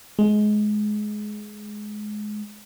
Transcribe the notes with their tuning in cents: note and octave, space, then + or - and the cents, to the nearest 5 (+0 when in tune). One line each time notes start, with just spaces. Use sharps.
G#3 +20